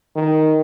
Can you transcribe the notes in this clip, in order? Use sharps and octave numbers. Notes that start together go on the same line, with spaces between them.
D#3